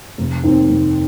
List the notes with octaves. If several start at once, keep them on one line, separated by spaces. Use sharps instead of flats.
F1
D#2 D#3 C4
F1